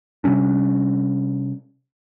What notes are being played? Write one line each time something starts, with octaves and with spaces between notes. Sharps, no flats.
C3 G3 C#4 D4